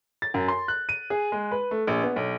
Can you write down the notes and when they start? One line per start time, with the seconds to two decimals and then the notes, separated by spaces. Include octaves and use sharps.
0.22 A6
0.34 F#2
0.48 C6
0.68 F#6
0.89 D#7
1.10 G#4
1.32 G#3
1.51 B4
1.71 A3
1.87 A#1
2.03 B3
2.16 B1